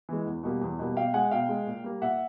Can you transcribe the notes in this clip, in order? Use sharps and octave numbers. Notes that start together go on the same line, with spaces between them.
E3 G#3
E2
B2 G3 A#3
E2
B2 G3 A#3
B2 F5 G5
G#3 F#5 G#5
B2 F5 G5
G#3
A#2
G3 A#3
A#2 E5 F#5